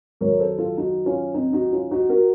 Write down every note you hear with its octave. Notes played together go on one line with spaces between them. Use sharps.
F#2 D#3 F#3 A#4 C#5
A4 C5
F4 A4
D#4 F#4
C#4 F4
C4 D#4
D#4 F#4
C#4 F4
D#4 F#4
F#4 A#4